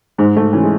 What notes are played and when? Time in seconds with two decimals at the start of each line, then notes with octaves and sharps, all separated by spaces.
0.18 G#2 G#3
0.36 G#2 A3
0.53 E3 C#4
0.63 G#3